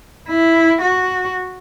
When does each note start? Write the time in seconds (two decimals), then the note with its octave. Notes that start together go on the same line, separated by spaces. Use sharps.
0.29 E4
0.81 F#4